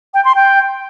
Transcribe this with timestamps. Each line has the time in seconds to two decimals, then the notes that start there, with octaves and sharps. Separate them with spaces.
0.14 G5
0.25 C6
0.35 G5